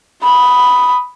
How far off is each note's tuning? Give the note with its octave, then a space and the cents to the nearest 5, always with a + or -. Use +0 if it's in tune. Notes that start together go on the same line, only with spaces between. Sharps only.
B5 +0 D#6 +0